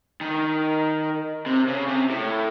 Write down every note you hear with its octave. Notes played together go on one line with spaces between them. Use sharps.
D#3
C3
C#3
C3
A2